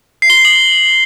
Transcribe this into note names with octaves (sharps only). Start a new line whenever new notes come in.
C7
G7
C7
F#7